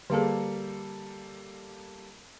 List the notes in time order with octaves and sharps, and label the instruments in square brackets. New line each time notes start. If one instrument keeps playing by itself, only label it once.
[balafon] D3 G#4 [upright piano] G3 A#3 A4